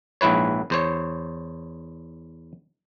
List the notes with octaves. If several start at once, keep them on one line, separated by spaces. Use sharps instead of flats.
A#1 G#2 E4 B4 C#5
E2 C5 C#5